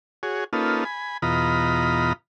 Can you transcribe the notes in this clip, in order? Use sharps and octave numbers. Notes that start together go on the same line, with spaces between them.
F#4 G#4 C#5
A#3 C#4 D#4 F4 A4 B4
G#5 B5
E2 B2 F4 D#5 A#5 B5